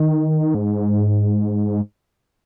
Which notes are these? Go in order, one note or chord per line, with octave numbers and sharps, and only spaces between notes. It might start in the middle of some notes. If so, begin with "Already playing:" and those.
Already playing: D#3
G#2